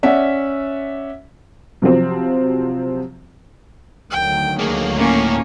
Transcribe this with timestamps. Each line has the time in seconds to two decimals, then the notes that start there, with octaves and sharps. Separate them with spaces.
0.03 C#4 D5 E5 F#5
1.82 C3 F3 F#3 C4
4.11 D2 D#3 F#3 G5
4.59 A3 A#3 G#4
4.98 A2 A#3 C#4 A#4 C#5